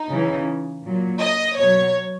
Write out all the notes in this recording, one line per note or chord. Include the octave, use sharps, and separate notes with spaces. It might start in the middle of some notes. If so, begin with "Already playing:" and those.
Already playing: D#4
C#3 E3
A#2 F#3
D#5
B2 F#3 C#5